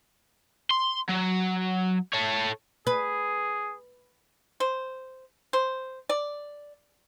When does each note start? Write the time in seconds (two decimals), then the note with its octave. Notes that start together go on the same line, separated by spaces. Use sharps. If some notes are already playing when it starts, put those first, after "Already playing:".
0.71 C6
1.09 F#3
2.13 A4 C#5
2.87 G#4 B4
4.60 C5
5.53 C5
6.09 D5